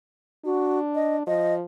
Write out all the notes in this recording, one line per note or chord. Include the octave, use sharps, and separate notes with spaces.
D4 F#4
D#5
F3 D#5